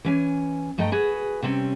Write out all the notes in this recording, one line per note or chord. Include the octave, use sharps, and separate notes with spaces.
E3 C#4 G#5
G2 A3 D#5 G5 A#5
F#4 G#4 B4
C3 G3 C4 C#4